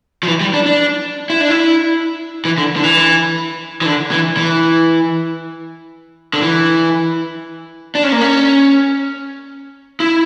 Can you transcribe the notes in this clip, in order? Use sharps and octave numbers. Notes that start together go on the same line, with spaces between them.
F3
E3
G3
D4
D4
E4
D4
E4
E3
D3
D3
E3
E3
D3
E3
E3
D3
E3
D4
C#4
A#3
C#4
E4